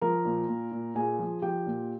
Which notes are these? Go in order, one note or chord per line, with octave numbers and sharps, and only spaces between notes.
F3 A#4 A#5
A#2
A#2
A#2
A#2 G#4 G#5
F3
F3 G4 G5
A#2